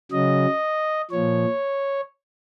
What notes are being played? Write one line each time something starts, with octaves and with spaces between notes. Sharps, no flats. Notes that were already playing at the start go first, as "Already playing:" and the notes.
C#3 F#3 D#5
A#2 F3 C#5